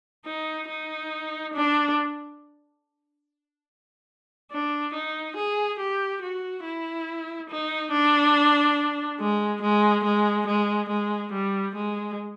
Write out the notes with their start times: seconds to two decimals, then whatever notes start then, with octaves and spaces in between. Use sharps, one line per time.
0.26 D#4
0.69 D#4
1.54 D4
4.52 D4
4.94 D#4
5.36 G#4
5.79 G4
6.22 F#4
6.64 E4
7.50 D#4
7.92 D4
9.20 G#3
9.62 G#3
10.05 G#3
10.47 G#3
10.89 G#3
11.33 G3
11.75 G#3